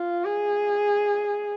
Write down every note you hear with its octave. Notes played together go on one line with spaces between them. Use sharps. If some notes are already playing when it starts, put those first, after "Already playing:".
Already playing: F4
G#4